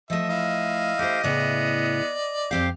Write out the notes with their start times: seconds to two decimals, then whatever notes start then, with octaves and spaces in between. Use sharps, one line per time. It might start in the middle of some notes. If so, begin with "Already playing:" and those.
0.10 F3 A3 D#5 E5
0.29 E4 F5
0.99 A3 G4 C5
1.24 A2 C#3 B3 E4 D5
2.51 F2 C4 G4 F5